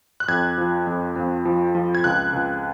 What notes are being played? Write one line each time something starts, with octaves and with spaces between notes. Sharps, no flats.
F#6
F2 G#6
F3
F2
F2
F3
F3
G#6
C#2 F#6
C#2